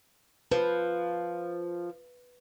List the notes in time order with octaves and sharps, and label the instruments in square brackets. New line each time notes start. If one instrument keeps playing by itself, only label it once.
[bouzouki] F3 [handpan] B4